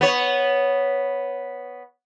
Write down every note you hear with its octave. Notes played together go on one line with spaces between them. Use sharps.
B3 C#5